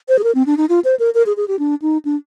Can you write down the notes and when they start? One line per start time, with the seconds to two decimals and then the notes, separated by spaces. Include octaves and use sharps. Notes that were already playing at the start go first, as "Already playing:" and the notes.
0.09 C5
0.19 G#4
0.24 A#4
0.35 C4
0.46 D4
0.57 D#4
0.69 F4
0.84 C5
0.99 A#4
1.14 A#4
1.26 G#4
1.37 G#4
1.48 G4
1.59 D4
1.82 D#4
2.05 D4